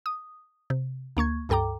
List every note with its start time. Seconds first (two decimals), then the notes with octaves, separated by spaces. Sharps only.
0.06 D#6
0.70 C3
1.17 D2 A#3 C#6 G#6
1.49 C#2 G2 A4 G5 A#5 D6